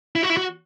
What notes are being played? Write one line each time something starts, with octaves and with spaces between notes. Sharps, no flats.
E4
F#4
E4
F#4